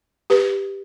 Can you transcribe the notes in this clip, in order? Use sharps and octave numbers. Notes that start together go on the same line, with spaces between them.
G4 B4